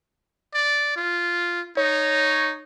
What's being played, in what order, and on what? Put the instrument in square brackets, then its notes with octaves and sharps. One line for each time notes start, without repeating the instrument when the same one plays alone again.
[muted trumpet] D5
F4
[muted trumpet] D#4 [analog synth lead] C#5